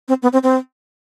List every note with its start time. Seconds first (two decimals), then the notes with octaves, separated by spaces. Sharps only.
0.08 C4
0.23 B3
0.33 C4
0.43 C4